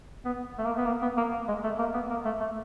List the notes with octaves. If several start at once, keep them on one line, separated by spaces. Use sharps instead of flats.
B3
A3
A#3
B3
A#3
B3
A#3
G#3
A3
A#3
B3
A#3
A3
A3